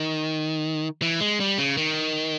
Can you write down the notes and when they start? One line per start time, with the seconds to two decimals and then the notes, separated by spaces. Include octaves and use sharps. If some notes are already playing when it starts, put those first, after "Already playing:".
Already playing: D#3
1.02 E3
1.21 G#3
1.40 G3
1.58 C#3
1.77 D#3